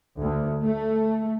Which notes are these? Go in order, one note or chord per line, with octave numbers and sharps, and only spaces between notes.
D2
A3